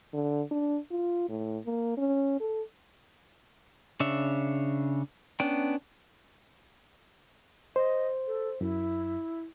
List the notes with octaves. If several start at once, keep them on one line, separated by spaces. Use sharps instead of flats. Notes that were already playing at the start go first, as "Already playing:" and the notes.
D3
D4
F4
A2
A#3
C#4
A4
C#3 D4 C#5 E5
B3 C#4 D4 G5
C5 D#5
A4
F#2 E4